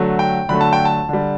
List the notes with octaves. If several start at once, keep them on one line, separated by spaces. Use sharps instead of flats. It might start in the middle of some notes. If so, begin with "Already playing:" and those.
Already playing: D3 F#3 A3
G5
D3 F#3 A3 B5
A5
G5
A5
D3 G3